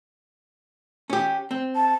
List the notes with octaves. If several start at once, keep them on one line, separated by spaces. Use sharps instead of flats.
C#4 G4
C4
A5